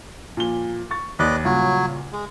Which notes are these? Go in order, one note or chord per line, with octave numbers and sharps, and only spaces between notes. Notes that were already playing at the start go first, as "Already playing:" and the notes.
A#2 F3 G7
C#6 A6
D#2 B4 D5 D#5
G2 A#2 C#3 F#3
G#3